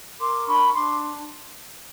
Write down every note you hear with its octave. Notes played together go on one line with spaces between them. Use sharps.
A#4 C6 D6
D4 B5 C#6
D4 C6 D6